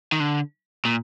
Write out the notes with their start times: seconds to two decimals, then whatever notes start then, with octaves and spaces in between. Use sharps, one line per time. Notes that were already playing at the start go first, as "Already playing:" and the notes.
0.12 D#3
0.20 D3
0.85 A#2